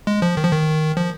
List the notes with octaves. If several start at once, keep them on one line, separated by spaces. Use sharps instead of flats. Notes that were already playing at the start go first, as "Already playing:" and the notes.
G#3
F3
D#3
F3
D#3
F3